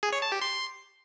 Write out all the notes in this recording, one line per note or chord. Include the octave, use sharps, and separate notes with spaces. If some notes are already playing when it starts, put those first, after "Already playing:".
G#4
C#5
A5
G4
C6